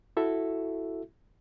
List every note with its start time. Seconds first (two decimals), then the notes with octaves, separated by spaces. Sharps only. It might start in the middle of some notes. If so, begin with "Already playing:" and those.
0.17 E4 F#4 A4 E5